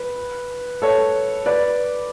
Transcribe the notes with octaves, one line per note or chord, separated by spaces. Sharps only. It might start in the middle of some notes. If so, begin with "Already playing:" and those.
Already playing: B4
A4 C#5
B4 D5